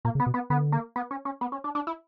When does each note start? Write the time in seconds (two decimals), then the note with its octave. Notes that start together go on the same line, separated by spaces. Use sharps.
0.05 A#2 A#3
0.15 C#3
0.20 B3
0.26 B2
0.34 B3
0.50 D3 B3
0.72 A#3
0.96 B3
1.11 C#4
1.25 C#4
1.41 B3
1.52 C#4
1.64 D4
1.75 D4
1.87 E4